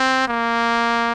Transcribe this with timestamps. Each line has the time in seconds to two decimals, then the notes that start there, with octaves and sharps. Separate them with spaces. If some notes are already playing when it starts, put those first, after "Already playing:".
Already playing: C4
0.28 A#3